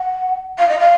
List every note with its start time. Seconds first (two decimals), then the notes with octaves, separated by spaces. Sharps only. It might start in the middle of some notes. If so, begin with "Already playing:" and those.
Already playing: F#5
0.58 F5
0.69 D#5
0.79 F5